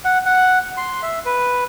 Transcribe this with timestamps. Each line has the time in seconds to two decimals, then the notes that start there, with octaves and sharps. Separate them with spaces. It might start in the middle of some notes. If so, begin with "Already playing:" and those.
0.05 F#5
0.25 F#5
0.77 C6
1.02 E5
1.26 B4